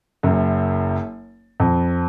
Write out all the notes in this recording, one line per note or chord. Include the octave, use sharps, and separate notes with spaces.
F#1 F#2
F2